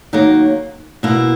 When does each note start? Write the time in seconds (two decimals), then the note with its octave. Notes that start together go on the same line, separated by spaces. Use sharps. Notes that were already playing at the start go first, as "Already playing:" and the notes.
0.13 D#3 F#3 A#3
1.03 B2 A#3 E4